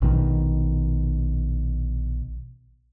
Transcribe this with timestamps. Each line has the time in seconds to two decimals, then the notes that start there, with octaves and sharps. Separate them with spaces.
0.02 A#1 B2 D3 D#3